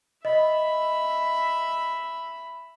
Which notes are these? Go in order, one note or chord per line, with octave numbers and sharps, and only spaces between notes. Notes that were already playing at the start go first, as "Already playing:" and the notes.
D#5 E5 B5